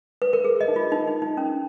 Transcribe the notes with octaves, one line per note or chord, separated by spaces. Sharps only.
B4
A#4
G#4
D#5
D#4
F4
D#4
D#4
D#4
C#4